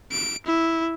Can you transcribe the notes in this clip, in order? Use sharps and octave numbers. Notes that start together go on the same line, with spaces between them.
D7
E4